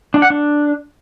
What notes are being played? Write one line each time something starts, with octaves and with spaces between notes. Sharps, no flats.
D4
F#5
D4